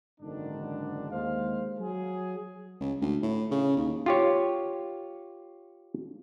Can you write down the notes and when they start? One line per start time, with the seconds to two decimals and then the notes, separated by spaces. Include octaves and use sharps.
0.21 F#1 G#2 D3 D#3 D4
1.10 D#2 G#3 C5 F5
1.79 F#3 G#4
2.81 C#2
3.01 D2
3.23 A2
3.51 C#3
3.77 D#2
4.06 F4 G4 C#5